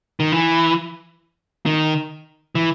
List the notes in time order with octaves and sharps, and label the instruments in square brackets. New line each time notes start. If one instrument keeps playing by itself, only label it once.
[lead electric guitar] D#3
E3
D#3
E3